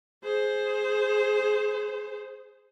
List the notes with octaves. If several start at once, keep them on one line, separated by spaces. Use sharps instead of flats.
G#4 C5